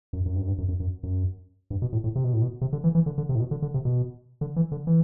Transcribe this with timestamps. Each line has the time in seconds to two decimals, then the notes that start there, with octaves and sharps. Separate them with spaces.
0.13 F#2
0.26 F#2
0.35 G2
0.41 F#2
0.47 G2
0.58 F#2
0.68 F#2
0.80 F#2
1.03 F#2
1.70 G2
1.82 B2
1.93 A2
2.04 A2
2.16 C3
2.24 B2
2.33 A2
2.42 B2
2.61 C3
2.73 D3
2.84 E3
2.95 E3
3.06 D3
3.18 D3
3.29 C3
3.35 A2
3.40 B2
3.51 D3
3.62 D3
3.74 C3
3.85 B2
4.41 D3
4.56 E3
4.72 D3
4.87 E3